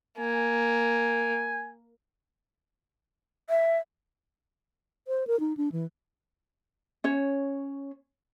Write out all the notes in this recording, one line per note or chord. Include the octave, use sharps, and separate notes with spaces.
A#3 G#5
E5
C5
A#4
D#4
D4
E3
C#4 C#5